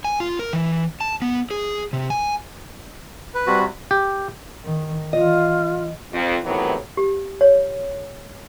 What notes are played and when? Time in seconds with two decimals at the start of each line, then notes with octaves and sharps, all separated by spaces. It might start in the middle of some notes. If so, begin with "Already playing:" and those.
0.04 G#5
0.20 F4
0.39 A#4
0.53 E3
1.01 A5
1.22 B3
1.51 G#4
1.93 C3
2.10 G#5
3.35 B4
3.47 C3 G3 F#4 B5
3.91 G4
4.64 D#3
5.13 E3 F4 D#5
6.12 F2
6.44 A2 C3 D#3 E3 F#3 B3
6.97 G4
7.41 C#5